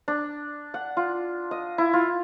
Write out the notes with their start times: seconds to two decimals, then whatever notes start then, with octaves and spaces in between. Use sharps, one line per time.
0.08 D4
0.74 F#5
0.97 F4
1.51 D#5
1.78 E4
1.93 F4